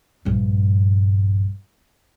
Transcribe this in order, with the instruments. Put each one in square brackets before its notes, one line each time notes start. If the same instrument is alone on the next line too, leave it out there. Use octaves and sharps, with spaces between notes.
[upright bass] A#1 G2